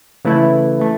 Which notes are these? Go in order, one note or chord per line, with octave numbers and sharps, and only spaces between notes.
C#3 E3 A3 E4
E3 A3